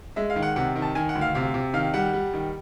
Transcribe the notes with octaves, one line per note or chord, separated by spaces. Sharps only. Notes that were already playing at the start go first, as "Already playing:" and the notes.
G#3 E5
F5
D#3
F#5
C3 F#5
D#3
A5
D#3 G#5
F#5
D2
F5
C3 F5
C3
D#3 F5
G3 F#5
G3
D#3